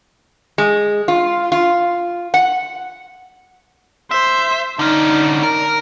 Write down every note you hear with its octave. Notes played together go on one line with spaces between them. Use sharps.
G#3
F4
F4
F#5
C5 E5
D3 C#4 D#4 D5
A#4